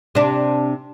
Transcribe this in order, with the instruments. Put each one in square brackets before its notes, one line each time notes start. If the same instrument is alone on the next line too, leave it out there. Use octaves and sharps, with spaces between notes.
[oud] C3 D4